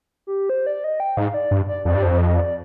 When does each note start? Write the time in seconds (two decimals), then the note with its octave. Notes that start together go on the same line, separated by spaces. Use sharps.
0.27 G4
0.50 C5
0.67 D5
0.84 D#5
1.00 G5
1.17 G#2 F5
1.34 D5
1.51 G2
1.68 D5
1.85 F2 D5
1.95 G2
2.03 F2 C5
2.18 D#5
2.36 D5